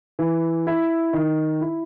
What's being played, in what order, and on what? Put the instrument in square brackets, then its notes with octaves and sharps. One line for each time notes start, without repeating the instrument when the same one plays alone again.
[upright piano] E3
E4
D#3
E4